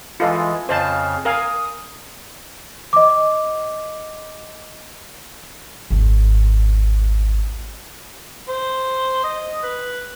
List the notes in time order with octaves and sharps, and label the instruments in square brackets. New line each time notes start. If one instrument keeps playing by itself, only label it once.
[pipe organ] E3 G#3 [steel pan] F4 A4 D#5
[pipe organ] F2 C#3 F5 [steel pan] C5 D#5 A5
[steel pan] A#4 F5 G#5 [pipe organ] D#6
[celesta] D#5 D6
[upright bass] G#1 D2
[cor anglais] C5
D#5
B4